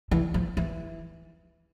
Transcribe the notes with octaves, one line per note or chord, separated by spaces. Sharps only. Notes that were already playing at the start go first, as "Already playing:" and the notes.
E3
F3
E3